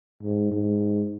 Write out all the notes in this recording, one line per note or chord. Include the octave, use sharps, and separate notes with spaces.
G#2
G#2